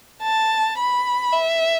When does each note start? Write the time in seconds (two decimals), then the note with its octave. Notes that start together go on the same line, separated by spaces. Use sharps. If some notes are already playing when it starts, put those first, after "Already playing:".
0.23 A5
0.78 B5
1.33 E5